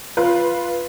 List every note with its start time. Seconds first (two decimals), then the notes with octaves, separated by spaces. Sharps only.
0.17 F4 B4